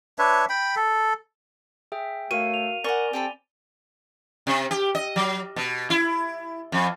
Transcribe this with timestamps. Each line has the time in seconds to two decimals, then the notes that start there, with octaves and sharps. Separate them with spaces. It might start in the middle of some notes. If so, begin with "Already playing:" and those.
0.19 D4 B4 C#5 E5
0.49 G5 B5
0.76 A4
1.92 G#4 E5 G5
2.31 A3 F#4 A#4 C#5 F5 D#7
2.54 F7
2.84 A#4 D5 F#5 G#5 C#6 G7
3.13 C4 G4 A4 B5
4.47 C3
4.71 G4
4.95 D#5
5.16 F#3
5.56 B2
5.90 E4
6.72 F2